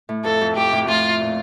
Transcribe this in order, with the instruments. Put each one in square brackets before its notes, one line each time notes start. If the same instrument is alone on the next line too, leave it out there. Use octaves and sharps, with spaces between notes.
[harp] A2
[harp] F2 [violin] A4
[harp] F2
[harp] F2 [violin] G4
[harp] A2
[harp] A2 [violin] F4
[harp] A#2